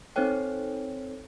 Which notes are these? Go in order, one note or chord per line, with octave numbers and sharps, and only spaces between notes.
C4 D#4 A4 C5 C#5 G5